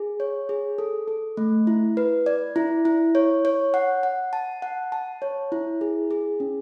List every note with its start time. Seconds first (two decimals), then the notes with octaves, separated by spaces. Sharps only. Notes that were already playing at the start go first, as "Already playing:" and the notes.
Already playing: G#4
0.20 C#5
0.49 G#4
0.78 A4
1.08 A4
1.37 A3
1.67 E4
1.97 B4
2.26 D5
2.56 E4
2.85 E4
3.15 C#5
3.45 C#5
3.74 F#5
4.03 F#5
4.33 A5
4.62 F#5
4.92 A5
5.22 C#5
5.52 E4
5.81 G#4
6.11 G#4
6.40 C#4